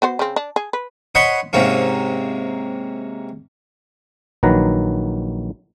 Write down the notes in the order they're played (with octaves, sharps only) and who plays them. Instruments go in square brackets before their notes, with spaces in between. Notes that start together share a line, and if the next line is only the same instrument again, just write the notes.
[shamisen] B3 F#4 C5
C#3 C4
D4
G#4
B4
[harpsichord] C5 C#5 D#5 F#5 B5 C6
G#2 C3 A#3 C#4
[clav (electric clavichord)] A#1 D#3 F#3 B4 A#5